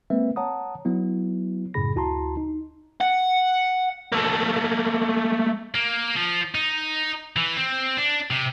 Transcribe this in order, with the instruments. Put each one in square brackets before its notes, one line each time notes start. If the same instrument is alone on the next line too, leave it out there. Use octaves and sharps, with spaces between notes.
[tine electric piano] G#3 A#3 C4 B4 E5
C#5 F#5 A5 A#5 D#6
F#3 B3 E4
F#2 A2 C#3 G#4 B5 A#6
D2 E4 F#4 A5 A#5 C6
D#4
[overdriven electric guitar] F#5
A3 A#3
[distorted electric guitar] A#3
F3
D#4
E3
C4
D4
C3